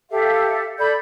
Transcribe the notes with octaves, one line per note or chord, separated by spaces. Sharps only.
G4 A4 E5 F5
A4 D5 B5 G6